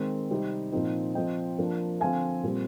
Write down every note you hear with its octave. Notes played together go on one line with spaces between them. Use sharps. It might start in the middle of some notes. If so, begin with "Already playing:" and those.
Already playing: D#3 G#3 C4
C3 G3 C4 D#4
A#2 F3 C4 D#4
F3 C4 D#4 D#5 G5
F3 A#3 D4
D3 F3 C4 F5 G#5
A#2 G3 C4